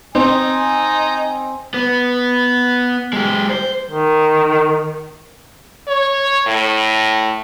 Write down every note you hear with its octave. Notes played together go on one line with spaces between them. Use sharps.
C4 D#4 G#5
B3
G#3 G4
C5
D#3
C#5
A2